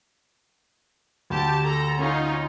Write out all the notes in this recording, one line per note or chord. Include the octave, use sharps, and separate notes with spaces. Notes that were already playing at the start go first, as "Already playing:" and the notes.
D2 G4 A5
A4 A#5
C#4 D#4 F4